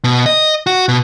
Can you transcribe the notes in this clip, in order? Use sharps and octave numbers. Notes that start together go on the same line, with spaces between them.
B2
D#5
F#4
B2